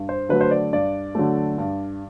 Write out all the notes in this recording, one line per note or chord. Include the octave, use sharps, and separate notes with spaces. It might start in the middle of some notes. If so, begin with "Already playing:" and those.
Already playing: G2
C5
D3 F#3 A3 B4
C5
D5
G2 D5
D3 F#3 A3
G2